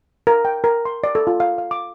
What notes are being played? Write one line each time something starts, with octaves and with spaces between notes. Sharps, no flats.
A#4
G5
A#4
C6
D5
A4
F4
F5
F5
D6